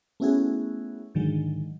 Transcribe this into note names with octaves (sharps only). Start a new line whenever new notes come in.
A3 B3 C#4 E4 F#4 G#4
G#2 D3 D#3 F#3 G#3